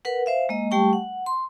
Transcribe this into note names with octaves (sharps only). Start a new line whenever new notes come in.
A#4 B4 F#5
C5 E5 F5
G#3 A#3 D#5
G3 A3 G4 G5 A5 C#6
F#5
C6